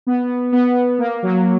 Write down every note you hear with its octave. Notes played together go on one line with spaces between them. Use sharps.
B3
B3
A#3
F#3